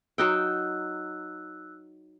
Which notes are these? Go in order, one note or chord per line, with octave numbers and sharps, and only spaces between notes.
F#3 D#4 G5 E6 F#6